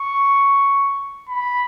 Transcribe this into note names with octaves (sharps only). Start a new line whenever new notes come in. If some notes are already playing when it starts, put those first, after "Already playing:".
Already playing: C#6
B5